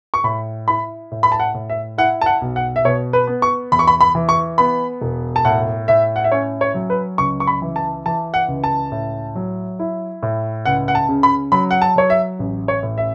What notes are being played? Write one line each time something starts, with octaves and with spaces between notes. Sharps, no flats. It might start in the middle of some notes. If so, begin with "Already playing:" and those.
C#6
A2 B5
E4 B5
A2
B5
A5
F#5
A2
E5
E4 F#5
A5
F#5
B1
F#5
E5
B2 C#5
B4
B3
C#6
E2 B5
C#6
B5
B5
E3
C#6
B3 B5
E1
A5
A2 F#5
A2 E5
F#5
E5
C#4 C#5
C#5
F#3
B4
C#2 C#6
C#6
B5
E3
A5
E3 A5
F#5
C#2
A5
A2
F#3
E4
A2
C#2 F#5
F#5
A5
C#3
B5
F#3 B5
F#5
A5
F#3 C#5
E5
A1
C#5
A2
E5